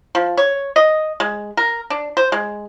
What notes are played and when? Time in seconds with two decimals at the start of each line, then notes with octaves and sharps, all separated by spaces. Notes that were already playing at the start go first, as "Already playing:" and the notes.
0.15 F3
0.37 C#5
0.76 D#5
1.20 G#3
1.57 A#4
1.90 D4
2.17 C5
2.32 G#3